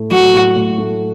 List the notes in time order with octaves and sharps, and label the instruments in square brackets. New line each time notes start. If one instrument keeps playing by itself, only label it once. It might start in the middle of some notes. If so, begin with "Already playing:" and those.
Already playing: [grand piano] A2 A3
[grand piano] F#3 [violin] F#4
[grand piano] A2
A2
A3